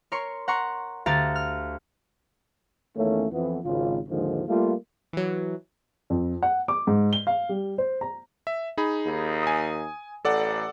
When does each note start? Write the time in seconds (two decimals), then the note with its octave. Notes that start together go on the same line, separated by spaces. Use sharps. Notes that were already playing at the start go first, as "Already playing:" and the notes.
0.12 A#4 C#5 C6 C#6
0.48 F#5 A#5 C6 C#6
1.06 D2 G4 F5 A#5 A6
1.35 F6
2.97 E2 D#3 A3 A#3 C#4
3.32 F2 E3 B3
3.64 G#1 C#3 F4
4.09 D#2 G#2 D3 D#3 F3 G#3
4.48 G3 A3 A#3 F4
5.13 E3 F#3
6.10 F2
6.42 F#5
6.68 D6
6.87 G#2
7.13 G7
7.27 F5
7.49 G3
7.78 C5
8.01 A#5
8.47 E5
8.77 D#4 G#4 B5
9.06 D#2
9.43 G#5 D#6
10.25 A1 A4 D5 F#5